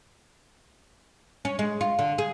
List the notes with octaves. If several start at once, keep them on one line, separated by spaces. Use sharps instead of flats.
C#4
G#3
F4
D3
G#4